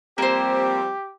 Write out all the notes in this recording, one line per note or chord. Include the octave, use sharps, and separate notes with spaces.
F3 G3 A#3 C4 G4 C5